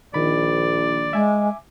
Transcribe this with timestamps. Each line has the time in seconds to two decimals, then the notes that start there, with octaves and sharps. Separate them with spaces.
0.14 A#1 D#3 D5 B5
1.13 G#3 E5 G#5 D6